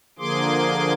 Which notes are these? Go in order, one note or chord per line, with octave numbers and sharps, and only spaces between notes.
D3 F3 A#3 G#4 C6 D6